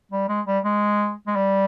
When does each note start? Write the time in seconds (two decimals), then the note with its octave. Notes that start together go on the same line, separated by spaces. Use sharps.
0.12 G3
0.29 G#3
0.46 G3
0.64 G#3
1.27 G#3
1.36 G3